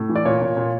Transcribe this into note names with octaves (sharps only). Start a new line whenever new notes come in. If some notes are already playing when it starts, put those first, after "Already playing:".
Already playing: A2
E3
D5
A#2 C#5
A#2
A#2